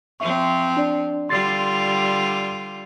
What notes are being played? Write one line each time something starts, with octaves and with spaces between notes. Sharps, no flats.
F3 C4 E5 C#6
D4 D5
D3 G3 F4 C6 A6 C7